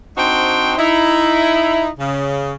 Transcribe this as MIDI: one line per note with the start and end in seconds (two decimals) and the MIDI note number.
0.16 0.74 60
0.16 0.74 62
0.16 0.74 63
0.16 0.74 66
0.16 0.74 72
0.16 0.74 79
0.77 1.88 63
0.77 1.88 64
1.99 2.53 49